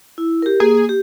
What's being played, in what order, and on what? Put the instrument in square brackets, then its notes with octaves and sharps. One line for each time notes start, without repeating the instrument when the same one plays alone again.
[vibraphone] E4
G4 A#4
[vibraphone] A#3 [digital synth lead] G#4
[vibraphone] G4